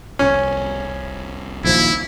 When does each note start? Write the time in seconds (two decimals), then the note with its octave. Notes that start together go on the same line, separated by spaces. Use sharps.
0.19 F1 C2 C#4
1.64 A#1 D#2 F3 E4